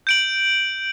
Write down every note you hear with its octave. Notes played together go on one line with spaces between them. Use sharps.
G6 D7 F#7